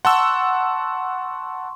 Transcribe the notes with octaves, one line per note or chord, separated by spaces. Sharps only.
F#5 A5 C6 C#6 E6